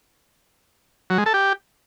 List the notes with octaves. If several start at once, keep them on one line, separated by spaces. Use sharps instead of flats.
F#3
G#3
A4
G4